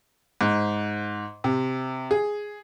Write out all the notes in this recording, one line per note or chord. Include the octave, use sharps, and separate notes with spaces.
G#2
C3
G#4